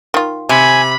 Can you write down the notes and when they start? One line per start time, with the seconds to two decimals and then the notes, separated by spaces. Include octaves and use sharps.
0.14 D#3 F4
0.49 C3 G#5 B5